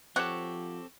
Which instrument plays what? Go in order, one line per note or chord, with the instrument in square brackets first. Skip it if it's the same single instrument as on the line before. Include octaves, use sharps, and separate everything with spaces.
[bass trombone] F3 [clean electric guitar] C4 A4 [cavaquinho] G4 C#5 C#6 [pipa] F#5